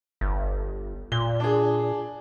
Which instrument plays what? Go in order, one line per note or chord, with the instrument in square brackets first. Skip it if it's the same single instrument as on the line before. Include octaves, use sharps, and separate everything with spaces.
[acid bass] G1
[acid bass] A#2 [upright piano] G7
[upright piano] D4 G#4